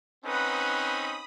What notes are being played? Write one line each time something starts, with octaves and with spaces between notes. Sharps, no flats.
C4 C#4 D#4 B4 F#5 B5 D#6